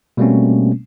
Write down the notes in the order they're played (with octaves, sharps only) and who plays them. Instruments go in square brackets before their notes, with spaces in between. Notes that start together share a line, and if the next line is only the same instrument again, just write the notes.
[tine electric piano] B2 G3 A3 A#3 C4 C#4